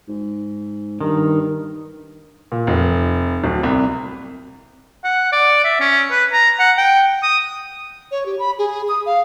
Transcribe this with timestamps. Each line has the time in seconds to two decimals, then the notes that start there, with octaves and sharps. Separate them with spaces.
0.08 G#2
1.01 G2 D#3
2.52 A#2
2.67 F1
3.44 D1
3.63 C2
5.04 F#5
5.33 D5
5.64 E5
5.80 C#4
6.11 B4
6.33 A#5
6.59 F#5
6.77 G5
7.23 D#6
8.11 C#5
8.26 G4
8.39 B5
8.58 G#4
8.88 D#6
9.06 F5